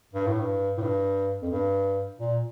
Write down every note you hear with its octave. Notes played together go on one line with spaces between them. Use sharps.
G2
A2
G2
A2
G2
F2
G2
A#2